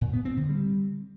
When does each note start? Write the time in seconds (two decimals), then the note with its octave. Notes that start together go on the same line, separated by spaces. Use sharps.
0.01 A#2
0.13 B3
0.25 C4
0.37 D3
0.49 G3